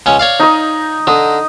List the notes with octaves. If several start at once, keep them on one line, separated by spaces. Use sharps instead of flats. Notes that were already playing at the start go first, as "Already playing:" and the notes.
C#2 C#4
C#5 D5 F5
D#4 D#5
D3 D#5